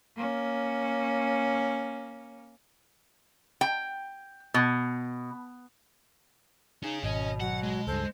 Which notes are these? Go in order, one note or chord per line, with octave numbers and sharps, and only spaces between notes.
A#3 C#4
G5
B2
C#4 D#4 G#4
G#1 B2 C#4 D#5
F#3 F#5
G#3
C#2 G2 A4 C5